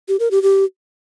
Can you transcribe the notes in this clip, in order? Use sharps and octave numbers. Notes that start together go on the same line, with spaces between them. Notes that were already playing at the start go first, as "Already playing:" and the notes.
G4
A#4
G4
G4